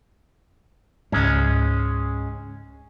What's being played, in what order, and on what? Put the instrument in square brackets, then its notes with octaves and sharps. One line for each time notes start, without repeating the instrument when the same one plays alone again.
[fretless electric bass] C#2 G#2 [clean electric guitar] G#3 C#4